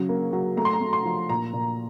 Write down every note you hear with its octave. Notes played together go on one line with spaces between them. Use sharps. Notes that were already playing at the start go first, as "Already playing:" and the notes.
Already playing: C#3 F#3
A#3
F#3
A3 A#5
C6
A#5
A3
C6
F3
A#2 A#5
A#2